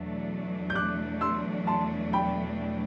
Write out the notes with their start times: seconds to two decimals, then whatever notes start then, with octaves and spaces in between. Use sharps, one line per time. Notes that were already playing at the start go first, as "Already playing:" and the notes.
Already playing: E2 B2 F#3 A3 D4
0.70 G6
0.75 D6 F#6
1.21 C6 E6
1.67 A5 C6
2.13 G5 B5